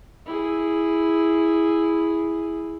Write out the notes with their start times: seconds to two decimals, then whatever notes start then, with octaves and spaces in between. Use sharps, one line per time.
0.26 E4 G#4